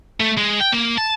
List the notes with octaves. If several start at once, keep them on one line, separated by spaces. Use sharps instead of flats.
A3
G#3
G5
A#3
A5